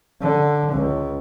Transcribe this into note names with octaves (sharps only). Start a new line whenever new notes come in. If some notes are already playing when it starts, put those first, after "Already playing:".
D3
C#2